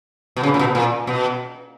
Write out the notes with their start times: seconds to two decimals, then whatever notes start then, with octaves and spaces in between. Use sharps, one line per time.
0.36 B2
0.43 C#3
0.54 A#2
0.59 B2
0.75 A#2
1.07 B2